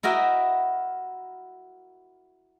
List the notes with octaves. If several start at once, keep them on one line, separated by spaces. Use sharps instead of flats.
E4 F#4 A#4 D#5 E5 G5